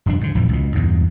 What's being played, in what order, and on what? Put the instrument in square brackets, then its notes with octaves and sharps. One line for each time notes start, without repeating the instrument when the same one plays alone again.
[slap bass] E1 F#2 A3 D4
G#2 D3
A#1 F2 A2 E3
C#2 B2
E2 G2